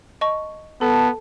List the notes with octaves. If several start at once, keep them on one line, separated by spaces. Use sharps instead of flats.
D#5 A5 C#6
B3 A4 A5